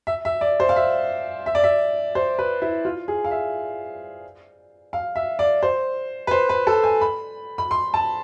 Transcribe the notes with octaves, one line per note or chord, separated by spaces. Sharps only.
E5
E5
D5
C5
F5
E5
E5
D5
E5
C5
B4
E4
F4
G#4
F5
E5
F5
E5
D5
C5
B4
C5
B4
A4
G#5
B5
B5
C6
A5